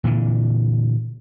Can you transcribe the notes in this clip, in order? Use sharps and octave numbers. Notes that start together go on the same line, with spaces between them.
A#2 D3 E3